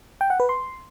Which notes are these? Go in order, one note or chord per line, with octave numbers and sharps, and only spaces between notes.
G5
F#5
B4
C6